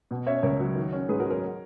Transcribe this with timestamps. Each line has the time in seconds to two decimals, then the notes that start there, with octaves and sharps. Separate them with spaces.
0.11 B2
0.26 C#4 C#5 E5
0.43 C#2 A#4 C#5
0.60 F#3
0.76 D#3
0.93 C#4
1.09 G#2 G#4 B4
1.20 F#4 A#4
1.25 F#3
1.30 A#4 C#5